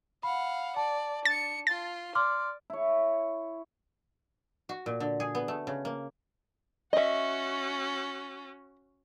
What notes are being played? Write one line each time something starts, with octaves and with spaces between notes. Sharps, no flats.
F5 F#5 B5
D5 A5
D4 A6 C#7
F4 C6 A6
D5 C6 D6 F6
E4 C#5
F#4
A#2
D3
G#4
B3
A3
C#3
A#3
C#4 F#4 D#5 E5